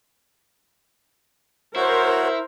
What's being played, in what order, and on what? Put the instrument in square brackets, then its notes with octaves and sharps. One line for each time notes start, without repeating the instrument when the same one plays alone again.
[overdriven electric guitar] E4 [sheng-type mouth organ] F#4 C#5 [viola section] A#4 C5